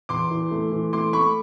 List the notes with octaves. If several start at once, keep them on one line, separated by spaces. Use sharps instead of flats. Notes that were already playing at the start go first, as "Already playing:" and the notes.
E2 C6 D6
E3
A3
E3
A3 C6 D6
A3 B5 C#6